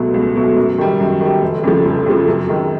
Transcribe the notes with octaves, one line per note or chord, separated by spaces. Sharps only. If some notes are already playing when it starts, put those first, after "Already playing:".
Already playing: C#2 B2 F#3 A3
C#2
B2 F#3 A3
F#2
D#3 G3
F#2
D#3 G3
F1
F2 C#3 F3
F1
F2 C#3 F3
F#2
D#3 G#3